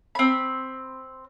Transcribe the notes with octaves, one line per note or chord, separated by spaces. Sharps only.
C4 B5